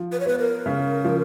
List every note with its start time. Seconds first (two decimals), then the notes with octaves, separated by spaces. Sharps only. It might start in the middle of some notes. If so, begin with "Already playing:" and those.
Already playing: F3
0.12 B4
0.20 C#5
0.26 B3 B4
0.39 A#4
0.66 C#3
1.04 F3